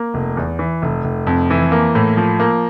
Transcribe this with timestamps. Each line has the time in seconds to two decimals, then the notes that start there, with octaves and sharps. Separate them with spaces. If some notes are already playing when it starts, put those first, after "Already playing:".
Already playing: A#3
0.14 F1
0.37 E2
0.59 E3
0.82 F1
1.04 F1
1.27 F2
1.50 E3
1.72 A#3
1.95 A2
2.17 F3
2.40 A#3